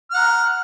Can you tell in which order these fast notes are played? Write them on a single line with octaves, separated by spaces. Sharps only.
F6 F#5 A#5